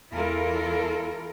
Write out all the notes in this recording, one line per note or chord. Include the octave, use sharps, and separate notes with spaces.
E2 E3 E4 F4 A4 A#4